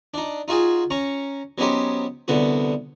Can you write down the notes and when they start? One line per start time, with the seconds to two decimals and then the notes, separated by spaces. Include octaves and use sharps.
0.14 D4 D#4
0.48 D#4 F4 F#4 G#4 G#5
0.90 C#4 A#5 C#6
1.58 F#3 B3 C#4 D#4 G4 C5
2.28 C2 D3 B3 F#4